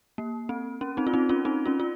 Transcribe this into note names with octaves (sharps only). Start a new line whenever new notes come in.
A#3
C4
C#4
C4 D#4
F4
C4 D#4
C#4 F4
C4 D#4
C#4 F4
F4